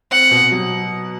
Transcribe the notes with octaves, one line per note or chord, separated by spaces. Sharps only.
C4 F#5
B2
F#3